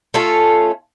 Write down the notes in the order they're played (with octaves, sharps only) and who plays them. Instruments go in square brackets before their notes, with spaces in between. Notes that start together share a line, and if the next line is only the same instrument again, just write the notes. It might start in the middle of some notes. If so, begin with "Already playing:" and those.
[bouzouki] A3 C#4 F4 A4